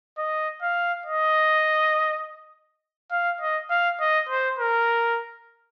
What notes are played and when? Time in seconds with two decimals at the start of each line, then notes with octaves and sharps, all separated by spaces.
0.18 D#5
0.62 F5
1.06 D#5
3.11 F5
3.41 D#5
3.70 F5
4.00 D#5
4.29 C5
4.59 A#4